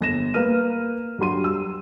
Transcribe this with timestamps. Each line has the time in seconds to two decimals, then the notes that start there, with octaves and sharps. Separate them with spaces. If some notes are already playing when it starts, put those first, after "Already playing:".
0.01 G1 A#6 E7
0.34 A#3 A#4 B4 F6 D#7
1.18 G2 F#3 G4 C6 D#7
1.44 E6